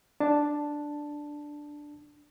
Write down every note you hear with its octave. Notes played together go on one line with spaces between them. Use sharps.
D4 A5